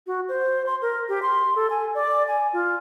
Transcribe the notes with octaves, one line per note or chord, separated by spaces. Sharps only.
F#4
C5
C6
A#4
G4
C6
A4
G#5
D5
G#5
F4